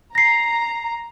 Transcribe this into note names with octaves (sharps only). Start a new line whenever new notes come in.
A#5 A#6 C7